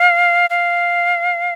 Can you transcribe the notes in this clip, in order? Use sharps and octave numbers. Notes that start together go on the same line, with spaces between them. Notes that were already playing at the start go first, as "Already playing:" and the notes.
Already playing: F5
F5